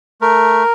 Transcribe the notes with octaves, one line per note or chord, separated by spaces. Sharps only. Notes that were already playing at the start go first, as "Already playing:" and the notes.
A3 A#4